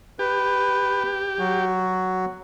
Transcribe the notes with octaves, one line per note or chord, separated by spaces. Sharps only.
G4 B4
F#3 F#4